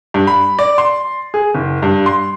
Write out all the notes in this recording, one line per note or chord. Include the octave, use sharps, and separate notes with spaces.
G2
B5
D5
C6
G#4
F#1
G2
C6